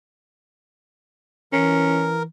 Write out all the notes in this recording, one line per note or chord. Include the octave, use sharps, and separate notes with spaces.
E3 C#4 A#4